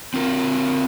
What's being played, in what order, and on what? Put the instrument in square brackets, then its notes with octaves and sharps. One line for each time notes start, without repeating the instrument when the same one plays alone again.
[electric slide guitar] C4 F4 A#4